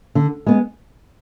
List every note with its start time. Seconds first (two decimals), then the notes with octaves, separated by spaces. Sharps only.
0.15 D3
0.46 G#3 B3